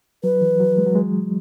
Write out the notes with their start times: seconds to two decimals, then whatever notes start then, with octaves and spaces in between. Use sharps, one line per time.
0.23 F#3 B4
0.41 E3
0.60 F#3
0.78 G#3
0.86 F#3
0.95 G#3